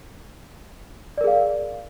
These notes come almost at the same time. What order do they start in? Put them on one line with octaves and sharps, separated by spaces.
D5 A#4 G#4 F5